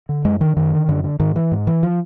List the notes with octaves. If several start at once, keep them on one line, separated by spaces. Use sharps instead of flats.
D3
F#2 G#3
D3 D#3
F#2 D#3
D3
F#2 D3
D3
G#2 D#3
E3
G#2
E3
F3